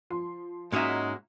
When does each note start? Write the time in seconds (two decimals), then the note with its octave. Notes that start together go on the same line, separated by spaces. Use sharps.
0.10 F3 C6
0.72 G#2 G#3 A#3 C#4 D#4 F#4 E5